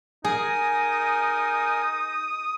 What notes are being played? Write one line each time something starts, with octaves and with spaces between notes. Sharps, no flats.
D#4 G#4 A#4 G#5 D#6